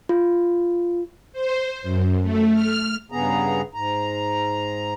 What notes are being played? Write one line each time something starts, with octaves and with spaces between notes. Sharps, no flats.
F4
C5
F#2
A3
F6
G2 C#3 B3 G#4 A#5
G#2 A#5